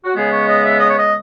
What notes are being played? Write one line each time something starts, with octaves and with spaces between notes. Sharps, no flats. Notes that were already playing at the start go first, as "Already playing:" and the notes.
F#4
C#3 G#3 B3 G#4
C#5
D#5
E5
D#5
C#5
D#5